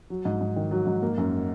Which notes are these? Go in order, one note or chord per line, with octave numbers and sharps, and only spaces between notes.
F#3
G#2
G#2
D#3
F#3
G#2
A#3
F#2